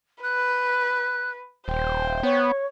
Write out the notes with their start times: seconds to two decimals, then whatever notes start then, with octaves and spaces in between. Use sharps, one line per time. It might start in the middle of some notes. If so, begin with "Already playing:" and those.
0.23 B4 F#6
1.68 D#1 C5 G5
2.23 B3 C#5